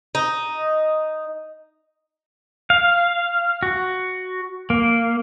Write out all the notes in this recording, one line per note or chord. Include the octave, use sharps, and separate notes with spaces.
D#4
F5
F#4
A#3